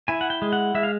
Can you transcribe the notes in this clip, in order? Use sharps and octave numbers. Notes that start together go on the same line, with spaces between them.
E4 G#5
F#5
G5
G#3
F#5
G#3 E5
F5